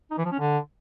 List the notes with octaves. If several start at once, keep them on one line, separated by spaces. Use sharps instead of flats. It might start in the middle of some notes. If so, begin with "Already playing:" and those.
D#4
E3
F3
C#4
D3